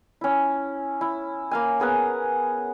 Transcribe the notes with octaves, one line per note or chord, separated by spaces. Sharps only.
C#4 E4
E4
A#3 F5 G#5
B3 G#4 A#4 F#5